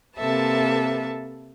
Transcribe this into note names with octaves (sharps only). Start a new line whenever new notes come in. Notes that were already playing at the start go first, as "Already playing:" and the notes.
C3 A#3 A4 B4 E5 A5